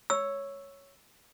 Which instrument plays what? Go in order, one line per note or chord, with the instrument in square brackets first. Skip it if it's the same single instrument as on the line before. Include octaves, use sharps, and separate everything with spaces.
[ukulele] C#5 [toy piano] E6